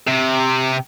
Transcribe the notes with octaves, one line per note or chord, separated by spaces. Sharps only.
C3